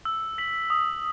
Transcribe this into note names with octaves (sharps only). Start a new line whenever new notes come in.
E6
B6 F#7
D#6